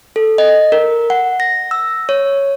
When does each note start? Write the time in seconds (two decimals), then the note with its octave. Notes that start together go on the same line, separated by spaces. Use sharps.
0.16 A4
0.38 D#5
0.72 A#4
1.10 F#5
1.40 A#6
1.71 E6
2.09 C#5